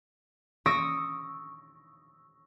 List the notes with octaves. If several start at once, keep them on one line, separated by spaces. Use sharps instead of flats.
C#6 D#6 E6 A#6 D7